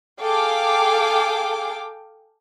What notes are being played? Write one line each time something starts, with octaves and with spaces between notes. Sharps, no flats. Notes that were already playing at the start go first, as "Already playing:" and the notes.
G#4 A4 F5 G5 D6